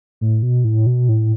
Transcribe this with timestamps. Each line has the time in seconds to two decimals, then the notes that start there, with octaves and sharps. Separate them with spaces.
0.21 A2
0.43 B2
0.64 A2
0.86 B2
1.09 A2